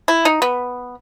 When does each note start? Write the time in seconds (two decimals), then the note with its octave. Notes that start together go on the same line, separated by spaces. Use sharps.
0.08 E4
0.25 D#4
0.42 B3